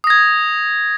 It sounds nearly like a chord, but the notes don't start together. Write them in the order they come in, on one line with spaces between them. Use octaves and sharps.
D#6 A#6 G#6